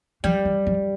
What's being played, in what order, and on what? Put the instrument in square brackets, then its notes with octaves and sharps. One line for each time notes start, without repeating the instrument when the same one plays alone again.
[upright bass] F3 [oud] G3
[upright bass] E3
F3